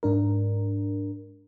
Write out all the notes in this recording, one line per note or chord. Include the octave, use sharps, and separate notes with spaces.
G#2 D4 A#4